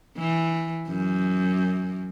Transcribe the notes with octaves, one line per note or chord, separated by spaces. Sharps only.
E3
F#2